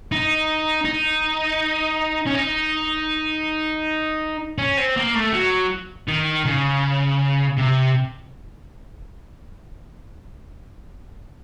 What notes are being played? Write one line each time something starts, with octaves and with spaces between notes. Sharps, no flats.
D#4
D#4
C#4
D#4
C#4
C4
A#3
A3
F#3
D#3
C#3
C3